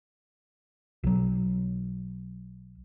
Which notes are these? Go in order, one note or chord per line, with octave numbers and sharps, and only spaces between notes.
B1 F#3